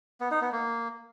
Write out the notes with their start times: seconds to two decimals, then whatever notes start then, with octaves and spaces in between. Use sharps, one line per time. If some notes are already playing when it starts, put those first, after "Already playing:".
0.21 B3
0.31 D#4
0.42 B3
0.52 A#3